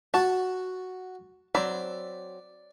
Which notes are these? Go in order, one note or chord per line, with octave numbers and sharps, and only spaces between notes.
F#4 F#5 A5
F#3 C4 D5 B5